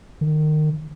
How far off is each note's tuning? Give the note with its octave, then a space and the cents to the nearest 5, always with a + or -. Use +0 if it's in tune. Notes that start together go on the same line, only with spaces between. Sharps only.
D#3 -25